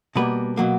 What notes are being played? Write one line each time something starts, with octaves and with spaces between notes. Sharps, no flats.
B2 G3 A#3 B4
B2 F#3 A#3